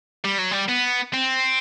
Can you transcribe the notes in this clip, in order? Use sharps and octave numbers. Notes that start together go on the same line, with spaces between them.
G3
F#3
G3
B3
C4